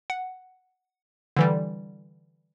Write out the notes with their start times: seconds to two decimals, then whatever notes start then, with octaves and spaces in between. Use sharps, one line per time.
0.10 F#5
1.37 D3 E3 G3